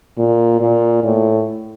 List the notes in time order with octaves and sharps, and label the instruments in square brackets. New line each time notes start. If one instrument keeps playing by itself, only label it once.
[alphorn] A#2
A#2
A2